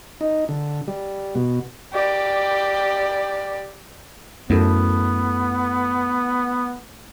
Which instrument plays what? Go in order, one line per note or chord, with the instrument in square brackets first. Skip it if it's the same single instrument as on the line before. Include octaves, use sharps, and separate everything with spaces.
[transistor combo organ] D#4
D3
G3
B2
[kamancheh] G4 D5
[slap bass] F#2 [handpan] A3 E4 A4 [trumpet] B3